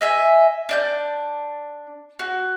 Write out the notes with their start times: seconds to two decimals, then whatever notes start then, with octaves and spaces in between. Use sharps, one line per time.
0.01 D#5 E5 G#5
0.69 D4 D5 G6
2.19 F#4